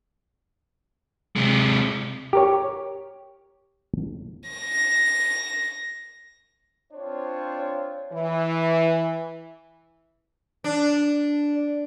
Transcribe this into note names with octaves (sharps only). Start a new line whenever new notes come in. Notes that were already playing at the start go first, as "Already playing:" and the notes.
C3 G#3
G4 A#4 C#5
A#6
C4 D4 F4 C5 C#5
E3
D4